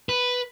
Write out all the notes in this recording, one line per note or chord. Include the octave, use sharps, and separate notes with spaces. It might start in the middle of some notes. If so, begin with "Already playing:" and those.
B4